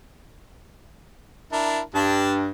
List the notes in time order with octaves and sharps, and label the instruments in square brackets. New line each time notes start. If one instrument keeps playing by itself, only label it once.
[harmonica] D4 E4 A#4
[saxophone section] G2 [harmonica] D4 A5